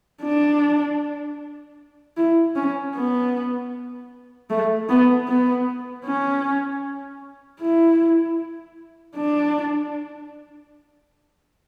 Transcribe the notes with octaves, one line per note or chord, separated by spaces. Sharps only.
D4
E4
C#4
B3
A3
B3
B3
C#4
E4
D4